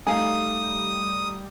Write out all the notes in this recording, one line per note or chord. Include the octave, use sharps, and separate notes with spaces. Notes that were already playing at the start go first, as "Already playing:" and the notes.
G3 A3 D#4 F5 G#5 D#6